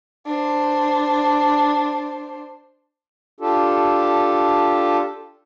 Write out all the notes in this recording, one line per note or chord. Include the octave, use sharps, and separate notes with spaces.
D4 C5
D4 F4 G4 A4